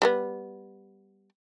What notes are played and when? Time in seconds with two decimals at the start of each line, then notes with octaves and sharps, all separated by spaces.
0.02 G3 A3 B3